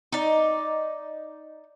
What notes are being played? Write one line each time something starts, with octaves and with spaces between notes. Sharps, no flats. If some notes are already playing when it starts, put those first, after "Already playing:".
D#4 D5